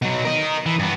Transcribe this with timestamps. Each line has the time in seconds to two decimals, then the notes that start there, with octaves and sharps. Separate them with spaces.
0.02 B2 F#3
0.25 A#4 D#5
0.66 E3
0.79 G2 B3